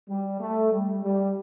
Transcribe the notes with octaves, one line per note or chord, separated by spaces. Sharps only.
G3
A3
G3
G3